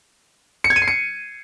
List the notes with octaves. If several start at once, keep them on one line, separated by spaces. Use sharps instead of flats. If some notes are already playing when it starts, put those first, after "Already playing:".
C#7
G#6
D#7
C7
C#7